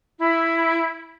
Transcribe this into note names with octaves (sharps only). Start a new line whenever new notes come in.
E4 B5